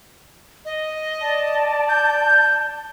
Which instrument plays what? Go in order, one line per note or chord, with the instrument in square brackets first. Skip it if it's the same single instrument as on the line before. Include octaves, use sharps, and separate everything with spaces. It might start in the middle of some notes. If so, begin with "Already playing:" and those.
[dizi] D#5
[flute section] D5 A5
[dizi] G6